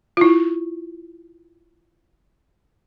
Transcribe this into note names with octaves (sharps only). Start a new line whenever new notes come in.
E4 F4